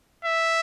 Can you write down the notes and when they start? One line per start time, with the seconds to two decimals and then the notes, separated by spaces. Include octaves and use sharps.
0.25 E5